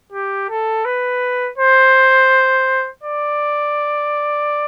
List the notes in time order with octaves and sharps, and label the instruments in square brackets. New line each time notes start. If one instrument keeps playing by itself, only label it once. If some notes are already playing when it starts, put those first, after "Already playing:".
[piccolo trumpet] G4
A4
B4
C5
D5